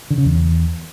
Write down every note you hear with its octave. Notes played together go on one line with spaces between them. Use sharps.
D3
C#3
E2